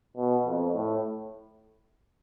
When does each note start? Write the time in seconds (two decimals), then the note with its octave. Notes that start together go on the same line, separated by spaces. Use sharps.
0.17 B2
0.45 F2
0.74 A2